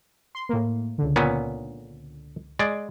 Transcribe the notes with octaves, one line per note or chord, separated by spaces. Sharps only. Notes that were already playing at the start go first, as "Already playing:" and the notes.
C6
A2 A#3
C#2 D3
A#2 B3 C#4
G#3 D5